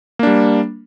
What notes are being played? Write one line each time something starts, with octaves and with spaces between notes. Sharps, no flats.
G3 A#3 D4